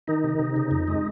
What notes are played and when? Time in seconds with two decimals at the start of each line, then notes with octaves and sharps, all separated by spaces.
0.08 D#3 D#4
0.24 C3
0.39 C3
0.56 C#3
0.71 F2
0.88 G#3